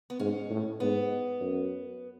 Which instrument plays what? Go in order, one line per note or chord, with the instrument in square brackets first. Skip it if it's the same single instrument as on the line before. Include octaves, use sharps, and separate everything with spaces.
[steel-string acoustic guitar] B3
[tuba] G#2 [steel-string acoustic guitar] C#4
[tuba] A2
[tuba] G#2 [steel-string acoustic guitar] B3
[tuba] F#2